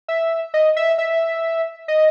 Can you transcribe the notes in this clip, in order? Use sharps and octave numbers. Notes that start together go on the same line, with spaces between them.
E5
D#5
E5
E5
D#5